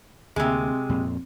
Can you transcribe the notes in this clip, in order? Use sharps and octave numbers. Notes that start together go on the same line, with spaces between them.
D2 C3 G#3 A#3 C4
F2 A#2